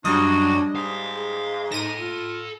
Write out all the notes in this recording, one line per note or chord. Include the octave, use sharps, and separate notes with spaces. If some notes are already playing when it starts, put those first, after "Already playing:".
F#2 F#3 G3 D4 D#5
G#2 F5
G#4
D#4 A4 B5 A#6 D#7
F4